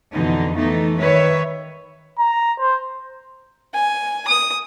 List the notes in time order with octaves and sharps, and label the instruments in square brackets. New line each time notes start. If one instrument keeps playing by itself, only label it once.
[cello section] F2 B2 D3 E3 D#4
E3 A3 B3 D#4
D#3 B4 C#5 E5
[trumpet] A#5
C5
[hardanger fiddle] G#5
D#6